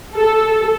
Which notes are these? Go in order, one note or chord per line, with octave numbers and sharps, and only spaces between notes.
A4